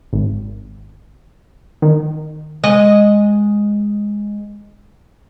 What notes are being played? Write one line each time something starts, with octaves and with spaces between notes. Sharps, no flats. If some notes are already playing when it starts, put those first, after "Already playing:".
G#1
D#3
G#3 D#5